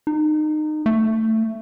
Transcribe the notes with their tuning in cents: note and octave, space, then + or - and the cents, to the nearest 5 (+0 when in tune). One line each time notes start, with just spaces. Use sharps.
D#4 -25
A3 +15